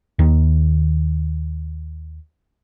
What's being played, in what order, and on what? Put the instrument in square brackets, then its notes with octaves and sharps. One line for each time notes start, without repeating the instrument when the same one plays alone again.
[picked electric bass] D#2 D#3